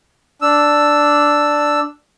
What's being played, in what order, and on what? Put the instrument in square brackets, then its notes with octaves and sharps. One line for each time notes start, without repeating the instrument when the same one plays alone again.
[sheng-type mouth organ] D4 E6